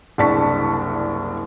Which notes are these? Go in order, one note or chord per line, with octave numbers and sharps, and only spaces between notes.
F#1 C2 D4 A5 C#6 B6